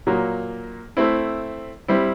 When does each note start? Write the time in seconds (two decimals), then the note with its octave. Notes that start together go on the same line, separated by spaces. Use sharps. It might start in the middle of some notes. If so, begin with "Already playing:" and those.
0.07 A#2 F#3 A#3
0.97 A3 C4 E4
1.88 G3 C4 E4